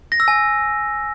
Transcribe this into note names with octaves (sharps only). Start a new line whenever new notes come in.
A#6
E6
G#5